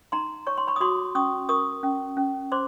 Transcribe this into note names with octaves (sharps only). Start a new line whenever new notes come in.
D#4 A#5 C6
C#5 C#6
C6
B5 C#6
D#6
F#4 C6 D6
C#4 C#6 D#6
A#4 C#6 D#6
C#4
C#4
C5 C6 D6